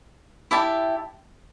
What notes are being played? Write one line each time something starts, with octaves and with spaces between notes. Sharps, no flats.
E4 G4 E5 A5